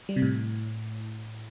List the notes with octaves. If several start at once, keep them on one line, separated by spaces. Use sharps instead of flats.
G3
C3
A2